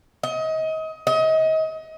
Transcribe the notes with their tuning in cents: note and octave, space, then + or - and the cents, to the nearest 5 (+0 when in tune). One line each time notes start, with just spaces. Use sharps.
D#5 +30
D#5 +30